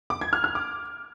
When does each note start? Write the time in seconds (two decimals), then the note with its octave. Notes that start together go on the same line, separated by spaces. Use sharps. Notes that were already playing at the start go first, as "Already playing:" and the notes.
0.10 D6
0.21 G#6
0.33 F6
0.44 F6
0.55 D6